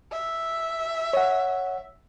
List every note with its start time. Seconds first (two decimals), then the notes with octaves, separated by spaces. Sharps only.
0.12 E5
1.13 C#5 F#5